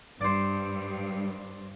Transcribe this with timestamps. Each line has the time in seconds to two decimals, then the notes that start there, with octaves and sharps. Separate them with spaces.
0.21 G2 C5 D5